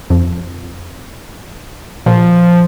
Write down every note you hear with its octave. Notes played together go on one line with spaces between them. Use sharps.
F2
A#2 F3